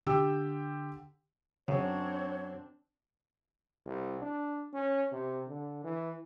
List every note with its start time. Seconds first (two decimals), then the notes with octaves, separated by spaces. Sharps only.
0.06 D3 G4 G5 E6
1.68 F#2 C#3 C4 D4 C#5
3.86 C2
4.21 D4
4.73 C#4
5.12 C3
5.48 D3
5.84 E3